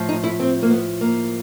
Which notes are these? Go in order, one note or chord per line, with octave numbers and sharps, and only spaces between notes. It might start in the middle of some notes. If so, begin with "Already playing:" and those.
Already playing: A2 F3
D#4
E4
C4
A#3
B3
A#3